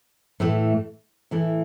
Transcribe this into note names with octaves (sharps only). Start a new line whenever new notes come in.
A2 E3 A3
A2 E3 A3